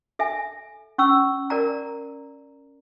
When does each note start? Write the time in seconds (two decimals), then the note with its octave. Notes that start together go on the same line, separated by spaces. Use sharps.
0.19 A4 E5 G#5
0.98 C#4 C#6 E6
1.50 A#4 D5 A#5